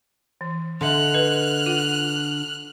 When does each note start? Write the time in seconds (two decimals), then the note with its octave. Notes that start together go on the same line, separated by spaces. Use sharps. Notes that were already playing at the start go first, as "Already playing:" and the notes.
0.41 E3
0.81 D3 D#5 E5 C6 F6 F#6
1.14 B4 D#5
1.66 F4 F#5